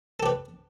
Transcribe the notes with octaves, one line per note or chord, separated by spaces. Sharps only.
G4 A4 B4